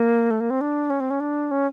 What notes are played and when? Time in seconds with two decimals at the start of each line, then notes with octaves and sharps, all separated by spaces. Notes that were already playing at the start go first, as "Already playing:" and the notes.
Already playing: A#3
0.31 A3
0.40 A#3
0.50 C4
0.61 D4
0.90 C#4
1.00 C4
1.10 C#4
1.20 D4
1.51 C#4